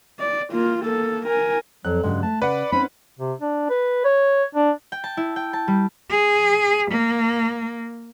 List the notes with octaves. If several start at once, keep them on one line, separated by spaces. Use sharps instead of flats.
D5
A#3 F4
A#3 A4
A#4 G#5
F2 F#3 F#6
G2 C#3 F#3 G#3
A3 A5
C#3 B4 D5 F#5
C4 C#4 D#4 B5
C3
D4
B4
C#5
D4
G5
A5
E4
G5
A5
G3
G#4
A#3